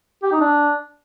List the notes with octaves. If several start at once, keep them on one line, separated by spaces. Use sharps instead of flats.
G4
D#4
D4